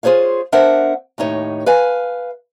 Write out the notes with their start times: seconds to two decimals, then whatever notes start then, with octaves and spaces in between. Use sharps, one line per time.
0.03 F4 G#4 C5 C#5 F5
0.52 B3 D4 A#4 C5 E5 F#5
1.18 D#2 A2 D#4 C#5
1.66 B4 F5 G#5